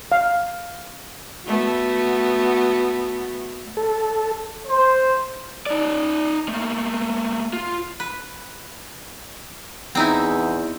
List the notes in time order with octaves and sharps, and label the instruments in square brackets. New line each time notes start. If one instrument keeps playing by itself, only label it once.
[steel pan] F5
[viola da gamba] A3 B3 F#4
[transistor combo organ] A4
[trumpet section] C5
[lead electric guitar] D#4 D5
A3 A#3
F4
[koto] B4
[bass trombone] E2 [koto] C4 D#4 E4